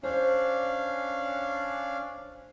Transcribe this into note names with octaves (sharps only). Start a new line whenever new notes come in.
C#4 D4 C5 F5